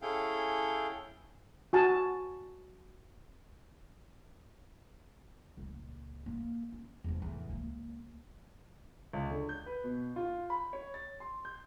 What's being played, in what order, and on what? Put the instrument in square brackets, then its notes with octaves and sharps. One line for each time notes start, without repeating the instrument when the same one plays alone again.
[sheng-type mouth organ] C#4 E4 G#4 A4 F5 G5
[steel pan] F#4 G#5 A5
[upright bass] C#2 A#2
A#3
C#4
E2 F3
E2 A2
C#2 A#3
[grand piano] C#2
D3
G6
B4
B2
F4
B5
C#5
A6
C6
G6